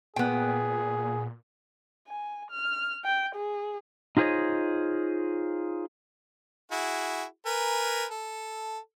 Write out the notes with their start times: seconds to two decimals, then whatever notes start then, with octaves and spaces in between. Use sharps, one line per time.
0.16 A#2 B3 G#4 G5
2.07 G#5
2.51 F6
3.05 G5
3.35 G#4
4.17 D#4 F4 G#4 C5 C#5 D#5
6.72 E4 F#4 G#4
7.46 A#4 B4 G#5
8.11 A4